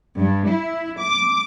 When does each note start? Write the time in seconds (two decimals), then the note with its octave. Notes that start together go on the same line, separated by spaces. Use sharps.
0.18 G2
0.48 E4
1.01 D6